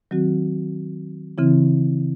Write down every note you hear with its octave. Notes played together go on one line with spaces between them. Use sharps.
D#3 F#3 C4 F#4
C#3 E3 C4 E4